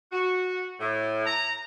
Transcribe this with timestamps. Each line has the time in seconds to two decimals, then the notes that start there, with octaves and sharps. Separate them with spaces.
0.11 F#4
0.80 A2
1.26 A#5